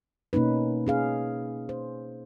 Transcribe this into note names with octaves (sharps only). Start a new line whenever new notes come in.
B2 A#3 C#4 D#4 B4
C#4 G#4 F5
C5